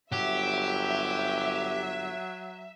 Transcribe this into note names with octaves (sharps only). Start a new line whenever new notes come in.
G1 F#3 G4 E5